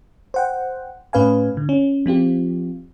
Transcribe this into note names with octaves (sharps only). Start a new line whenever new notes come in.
C5 F#5 G5
A2 C#4 B4 F5 G#5
D3
C#4
F3 C4 F4 G4